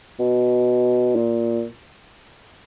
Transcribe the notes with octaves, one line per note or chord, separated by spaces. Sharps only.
B2
A#2